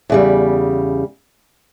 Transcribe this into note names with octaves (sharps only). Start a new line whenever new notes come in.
E2 C#3 G3